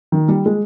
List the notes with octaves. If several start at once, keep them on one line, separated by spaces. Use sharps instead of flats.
D#3
G3
G#3